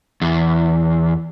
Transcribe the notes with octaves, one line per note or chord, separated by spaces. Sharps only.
E2